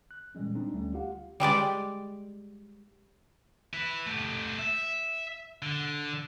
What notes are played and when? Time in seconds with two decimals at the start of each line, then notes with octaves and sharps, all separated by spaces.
0.11 F#6
0.35 A#2 E3 G3 G#3 C#4
0.55 G3 C4 D4 D#4
0.73 D2 G3 A3 C#4
0.94 F4 G4 F5 F#5
1.40 G3 G#3 G4 D5
3.73 E4 B4
4.07 A3 G4
4.59 E5
5.62 D3